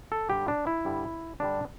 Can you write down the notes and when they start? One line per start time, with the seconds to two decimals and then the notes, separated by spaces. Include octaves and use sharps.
0.12 A4
0.30 G2 D3 G3 G4
0.48 D4
0.67 E4
0.85 G2 D3 G3
1.40 G2 D3 G3 D4